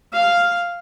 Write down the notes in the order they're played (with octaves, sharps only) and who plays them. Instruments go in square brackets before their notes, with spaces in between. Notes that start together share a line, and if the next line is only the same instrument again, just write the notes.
[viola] F5